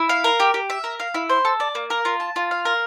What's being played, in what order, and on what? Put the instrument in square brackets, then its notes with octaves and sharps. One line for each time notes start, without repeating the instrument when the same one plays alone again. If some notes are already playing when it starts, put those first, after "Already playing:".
Already playing: [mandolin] E4
F5
A#4
G4
G4
E5
A#4
F5
E4
C5
A4
D5
A#3
A#4
F4
A5
F4
F5
A#4